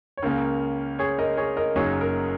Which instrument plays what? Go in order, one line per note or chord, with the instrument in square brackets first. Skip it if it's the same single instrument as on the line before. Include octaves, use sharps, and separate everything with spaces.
[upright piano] C#5
[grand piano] C#2 C#3 A#3 C#4 [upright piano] A#4
[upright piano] G#4 C#5
A#4 D#5
G#4 C#5
A#4 D#5
[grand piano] F#1 F#2 F#3 A#3 D#4 [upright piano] G#4 C#5
[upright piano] A#4